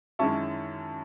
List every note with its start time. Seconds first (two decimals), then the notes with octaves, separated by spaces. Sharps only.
0.19 F#2 D#3 G#3 C#4 E4 A5 C#6